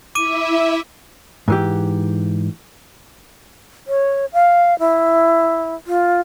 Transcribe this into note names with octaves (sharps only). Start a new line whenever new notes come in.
E4 E5 D6 D#7
G#2 E3 G4
C#5
F5
E4
F4